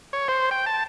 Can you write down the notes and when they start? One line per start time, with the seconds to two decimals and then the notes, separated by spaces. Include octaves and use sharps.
0.13 C#5
0.28 C5
0.51 G5
0.66 A5